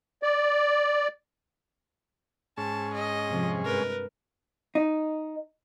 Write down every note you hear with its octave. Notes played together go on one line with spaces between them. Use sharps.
D5
G#2 C#4 G#4 A5
D#5
F2 C3 F3
G2 G#3 A#4 B4
D#4